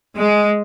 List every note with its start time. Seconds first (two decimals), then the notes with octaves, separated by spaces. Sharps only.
0.15 G#3